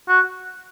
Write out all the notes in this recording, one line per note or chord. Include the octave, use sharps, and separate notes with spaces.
F#4